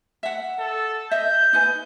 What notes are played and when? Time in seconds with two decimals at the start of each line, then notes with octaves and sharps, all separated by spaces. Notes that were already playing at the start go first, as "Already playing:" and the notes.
0.23 E5 F#5
0.59 A4
1.11 D#5 E5 G6
1.53 D#4 B4 G#5